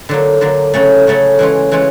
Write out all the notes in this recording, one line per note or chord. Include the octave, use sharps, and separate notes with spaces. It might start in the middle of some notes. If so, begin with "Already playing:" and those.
D3 F#3 A#3
D3 F#3 A#3
C#3 F#3 A3 C#4
C#3 F#3 A3 C#4
E3 G#3 C#4 F4
E3 G#3 C#4 F4